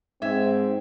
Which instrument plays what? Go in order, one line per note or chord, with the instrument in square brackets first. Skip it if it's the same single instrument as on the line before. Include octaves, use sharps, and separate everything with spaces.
[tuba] G#2 [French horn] C4 [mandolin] E5 G#5